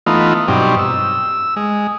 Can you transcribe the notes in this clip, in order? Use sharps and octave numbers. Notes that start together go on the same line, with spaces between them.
E3 A3 B3 D#4 F4
G2 B2 F#3 C4 D#4 G4
E6
G#3